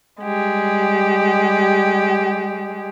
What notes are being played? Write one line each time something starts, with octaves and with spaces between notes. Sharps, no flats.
G3 G#3 G4